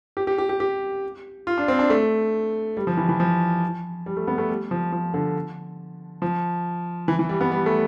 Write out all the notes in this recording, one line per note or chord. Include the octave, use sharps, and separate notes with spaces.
G4
G4
G4
G4
G4
F4
D4
C4
D4
A3
G3
F3
E3
E3
F3
G3
A3
B3
A3
G3
F3
F3
D3
F3
E3
E3
G3
B3
G3
A3